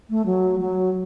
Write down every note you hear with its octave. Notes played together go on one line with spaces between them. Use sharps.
A3
F#3
F#3